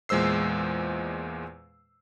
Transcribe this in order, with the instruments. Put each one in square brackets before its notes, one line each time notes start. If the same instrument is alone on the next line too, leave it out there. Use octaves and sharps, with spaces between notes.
[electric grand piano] E2 A#2 G#3 C5 E6 C7